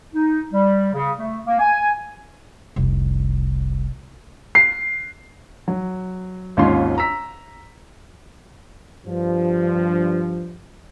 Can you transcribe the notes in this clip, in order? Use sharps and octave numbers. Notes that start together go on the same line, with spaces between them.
D#4
G3
C#3
A3
A#3
G#5
F1 C2
C7
F#3
G#1 D#2 C#4 D#4 F4 C6
A#5 E6 B6
G2 F3